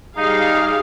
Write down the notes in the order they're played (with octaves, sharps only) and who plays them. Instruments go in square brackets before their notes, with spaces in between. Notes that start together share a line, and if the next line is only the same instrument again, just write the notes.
[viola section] G3 G#4 F5 [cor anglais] D#4